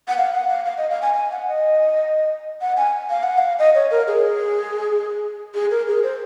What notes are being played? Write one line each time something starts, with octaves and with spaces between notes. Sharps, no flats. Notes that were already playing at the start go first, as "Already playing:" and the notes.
F#5
F5
F#5
F5
F5
D#5
F5
G#5
G#5
F#5
D#5
F#5
G#5
F5
F#5
F5
D#5
C#5
A#4
G#4
G#4
A#4
G#4
C5